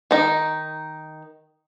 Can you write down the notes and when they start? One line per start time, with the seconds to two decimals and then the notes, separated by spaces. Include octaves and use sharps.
0.11 D#3 D#4